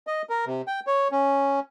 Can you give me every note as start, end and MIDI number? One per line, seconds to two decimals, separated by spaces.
0.07 0.22 75
0.29 0.45 70
0.46 0.62 48
0.67 0.80 79
0.87 1.08 73
1.12 1.60 61